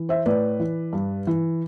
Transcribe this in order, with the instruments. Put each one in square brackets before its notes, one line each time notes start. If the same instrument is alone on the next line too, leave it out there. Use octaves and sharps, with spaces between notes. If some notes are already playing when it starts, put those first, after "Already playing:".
Already playing: [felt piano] E3
C5 E5
A2 B4 D5
E3
G2
E3